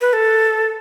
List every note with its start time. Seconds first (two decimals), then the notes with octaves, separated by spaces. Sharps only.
0.01 B4
0.13 A4